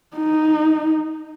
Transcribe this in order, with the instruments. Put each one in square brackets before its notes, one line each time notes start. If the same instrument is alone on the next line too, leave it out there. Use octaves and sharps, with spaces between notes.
[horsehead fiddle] D#4